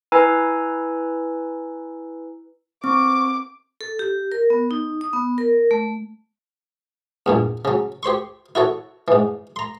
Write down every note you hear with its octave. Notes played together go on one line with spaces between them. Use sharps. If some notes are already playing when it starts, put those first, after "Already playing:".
E4 B4 G#5 A#5 E6
C4 C#6 D6
A4
G4
A#4
B3
D#4
D#6
B3
A#4
A3
E2 G2 A#2
C#3 F#3
G4 C5 C6 C#6
E4 F#4 A4 C#5
G#2 E3
A#5 C6